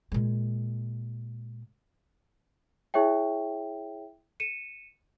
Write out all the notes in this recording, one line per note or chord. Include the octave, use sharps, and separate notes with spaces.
A#2 G#3
E4 G#4 C#5 E5 G5
C#7 D#7 E7